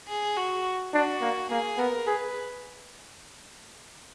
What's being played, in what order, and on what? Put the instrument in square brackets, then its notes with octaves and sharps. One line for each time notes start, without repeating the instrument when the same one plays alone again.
[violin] G#4
F#4
[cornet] D4 [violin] F#4
[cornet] A#3
[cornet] A#3 [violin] G#4
[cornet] B3 [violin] A#4
[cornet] G#4 [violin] B4